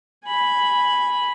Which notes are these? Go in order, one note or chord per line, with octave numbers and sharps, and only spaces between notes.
G#5 B5